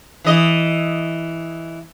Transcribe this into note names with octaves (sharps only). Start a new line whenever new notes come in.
E3 D#5